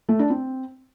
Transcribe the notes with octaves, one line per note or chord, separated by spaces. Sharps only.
A3
D4
C4